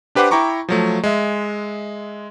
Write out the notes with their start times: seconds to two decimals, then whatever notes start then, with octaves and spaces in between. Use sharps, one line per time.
0.15 D4 G4 B4 C5 F#5 D6
0.31 E4 G5 A#5 C#6 D6
0.69 F3 F#3 A3
1.03 G#3 E5